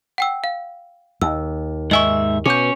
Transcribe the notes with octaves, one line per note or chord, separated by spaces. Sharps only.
F#5 G5 E6
F5
D#2 E6
G#2 D#5 E5 G#5 C#6
B2 C#4 D6 G6